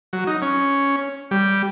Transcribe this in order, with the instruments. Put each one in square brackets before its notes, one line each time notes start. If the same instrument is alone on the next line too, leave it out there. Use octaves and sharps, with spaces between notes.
[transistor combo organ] F#3
D#4
C#4
G3